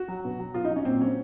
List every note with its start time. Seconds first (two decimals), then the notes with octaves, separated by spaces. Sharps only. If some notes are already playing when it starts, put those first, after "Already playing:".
Already playing: F#4
0.08 F#3
0.24 B2
0.39 F#3
0.54 B2 F4
0.65 D#4
0.71 F#3
0.76 C#4
0.85 A#2 C4
1.01 F#3 C#4